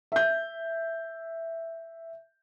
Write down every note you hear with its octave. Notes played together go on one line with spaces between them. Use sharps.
E5 G6